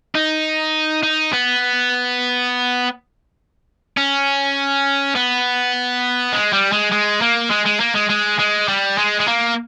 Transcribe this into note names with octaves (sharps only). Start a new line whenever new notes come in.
D#4
D#4
B3
C#4
B3
G#3
G3
G#3
G#3
A#3
G#3
G#3
A#3
G#3
G#3
G#3
G3
G#3
G#3
A#3